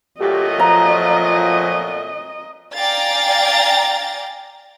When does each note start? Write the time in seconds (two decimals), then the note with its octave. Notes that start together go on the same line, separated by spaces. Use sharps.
0.20 A#2 F#3 A3 G4 D#5
0.59 F3 A#5
2.75 D5 F5 G5 G#5 A#5 A6